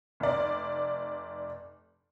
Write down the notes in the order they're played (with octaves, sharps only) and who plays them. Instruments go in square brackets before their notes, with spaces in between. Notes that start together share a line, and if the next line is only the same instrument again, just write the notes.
[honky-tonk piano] F1 D5